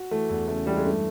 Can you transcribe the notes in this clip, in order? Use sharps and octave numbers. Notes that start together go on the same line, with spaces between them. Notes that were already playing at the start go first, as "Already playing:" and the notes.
Already playing: F#4
E3 A3
E2
C#3 A3
E3 G3
G#3
G2 A3